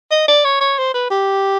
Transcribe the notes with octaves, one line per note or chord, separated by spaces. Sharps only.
D#5
D5
C#5
C#5
C5
B4
G4